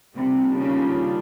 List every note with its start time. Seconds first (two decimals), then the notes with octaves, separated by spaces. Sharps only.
0.16 C3 D#3 G3 A#3 D4 F4
0.57 C#3